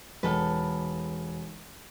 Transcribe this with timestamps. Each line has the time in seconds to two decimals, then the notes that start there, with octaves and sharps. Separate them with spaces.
0.23 E1 D#3 A4 B4